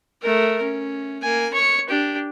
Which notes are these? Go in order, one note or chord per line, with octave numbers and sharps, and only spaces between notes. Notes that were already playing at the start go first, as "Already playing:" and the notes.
A3 A#4
C#4
A#3 G#5
C#5 C#6
D4 G4